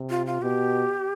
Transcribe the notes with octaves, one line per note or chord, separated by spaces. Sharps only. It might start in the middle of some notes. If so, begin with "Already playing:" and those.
Already playing: C3
F4
F4
B2 G4